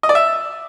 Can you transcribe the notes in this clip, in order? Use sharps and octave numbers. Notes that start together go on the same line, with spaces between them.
D#5
D5
E5